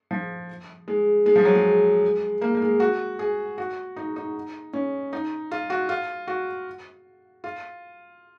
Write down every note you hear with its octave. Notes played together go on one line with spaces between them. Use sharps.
F3
G#3
G#3
F3
F#3
G#3
A#3
A#3
G#3
F#4
G#4
F#4
D#4
D#4
C#4
D#4
F4
F#4
F4
F#4
F4